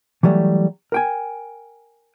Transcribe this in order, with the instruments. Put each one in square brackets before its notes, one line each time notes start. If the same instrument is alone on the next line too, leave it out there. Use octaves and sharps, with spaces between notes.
[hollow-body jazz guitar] E3 F#3 G3 A3
A#4 G5 G#5